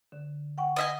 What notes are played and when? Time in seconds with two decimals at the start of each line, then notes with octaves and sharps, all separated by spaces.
0.12 D3
0.58 F#5 G5 C#6
0.76 D#5 E5 G#5